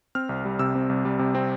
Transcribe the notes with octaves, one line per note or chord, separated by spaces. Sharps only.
C4 F6
C2
G3
C3 E6
C4
C2
G3
C3
C4